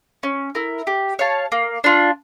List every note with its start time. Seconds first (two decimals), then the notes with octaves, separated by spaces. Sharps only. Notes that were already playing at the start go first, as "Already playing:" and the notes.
0.23 C#4
0.55 E4 A#4
0.87 G4
1.19 C#5 F5 A5
1.52 A#3
1.84 D4 F4